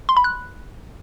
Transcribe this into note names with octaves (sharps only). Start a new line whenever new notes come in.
C6
B5
F#6